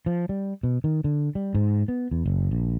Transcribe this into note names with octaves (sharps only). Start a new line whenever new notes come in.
F3
G3
B2
D#3
D3
G3
G#2
B3
E2
F#1
A#1